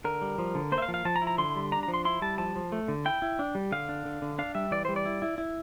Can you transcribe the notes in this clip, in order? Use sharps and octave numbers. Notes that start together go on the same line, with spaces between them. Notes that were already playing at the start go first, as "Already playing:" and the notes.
D3 A#4
G3
F3
D3
A#3 C5
E5
F5
F3
F5
F3 A5
A#5
E4
A#5
D3 C6
G3
D4 A#5
A#5
F3
C6
E4 C6
G3 A5
F3 A5
F3
A3
D3
E4 G5
E4
D4
G3
D3 F5
D4
D3
D3
D4 F5
G3 E5
E3 D5
G3 C5
D5
E4
E4
E4